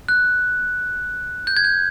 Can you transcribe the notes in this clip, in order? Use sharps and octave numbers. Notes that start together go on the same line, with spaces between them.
F#6
G6
G#6
G6